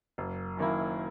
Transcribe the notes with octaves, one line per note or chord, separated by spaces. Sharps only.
F#1
F#2 D#3 A#3 E4